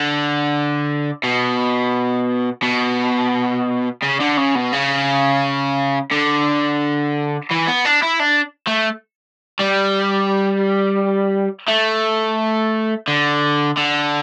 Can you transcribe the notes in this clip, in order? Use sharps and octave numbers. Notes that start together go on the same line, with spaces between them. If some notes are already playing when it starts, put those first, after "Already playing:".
Already playing: D3
B2
B2
C#3
D3
C#3
B2
C#3
D3
E3
B3
D4
E4
D4
A3
G3
A3
D3
D3